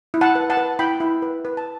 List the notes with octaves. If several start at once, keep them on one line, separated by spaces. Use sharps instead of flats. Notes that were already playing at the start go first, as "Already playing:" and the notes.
E4
F#5 A5
B4
F#5 A5
B4
E4 G5 B5
E4
B4
B4
A5